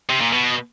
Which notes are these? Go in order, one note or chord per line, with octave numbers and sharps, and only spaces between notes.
C3
A#2
B2